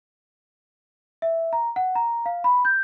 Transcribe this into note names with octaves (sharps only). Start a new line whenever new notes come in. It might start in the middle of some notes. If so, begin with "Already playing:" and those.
E5
A#5
F#5
A#5
F5
B5
G6